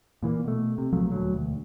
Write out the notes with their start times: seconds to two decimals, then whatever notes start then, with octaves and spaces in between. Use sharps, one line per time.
0.23 A#2 E3 G#3 A#3
0.44 B2 A3
0.78 C3
0.93 A#1 F3 F#3 A3
1.12 D#1 D2 F#3
1.34 E1 D2